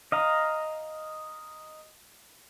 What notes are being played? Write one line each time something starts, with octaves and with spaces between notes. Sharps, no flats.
D#5 F5 A#5